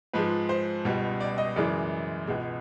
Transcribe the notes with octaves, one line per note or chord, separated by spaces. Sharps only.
G#2 F3 G#3 B4
C5
C#2 B2 G3
D5
D#5
F#2 C#3 E3 G#3 D5
C#2 B2 G#3